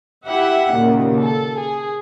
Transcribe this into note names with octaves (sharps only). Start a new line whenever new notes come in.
E4 G4 E5 F#5
D#2 A#2 C#3
A4
G#4